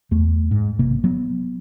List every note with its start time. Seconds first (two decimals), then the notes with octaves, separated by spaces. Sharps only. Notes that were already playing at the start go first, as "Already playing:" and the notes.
0.11 E2 A3
0.51 G#2
0.79 G#1 C3 A#3
1.04 F#3 B3